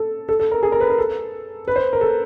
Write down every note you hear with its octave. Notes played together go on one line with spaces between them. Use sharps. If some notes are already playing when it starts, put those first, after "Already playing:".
Already playing: A4
A4
A4
A#4
G#4
A#4
B4
A#4
A4
B4
C5
A#4
A4